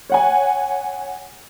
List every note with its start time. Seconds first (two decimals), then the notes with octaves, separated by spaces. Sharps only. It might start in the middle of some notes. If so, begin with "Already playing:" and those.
0.10 C#5 F#5 G#5